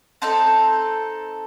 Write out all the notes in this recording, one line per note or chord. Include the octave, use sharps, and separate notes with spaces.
C4 D#4 A4 A5